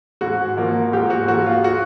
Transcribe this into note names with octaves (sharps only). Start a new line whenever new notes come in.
G#2 F#4
F3 A#3
G#2 G4
F#4
F3 A#3 F#4
F4
F#4